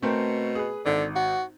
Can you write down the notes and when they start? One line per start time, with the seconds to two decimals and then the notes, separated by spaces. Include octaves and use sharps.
0.02 B2 A3 C4 A#4
0.55 G#4 B4
0.85 G#1 D3
1.16 F#4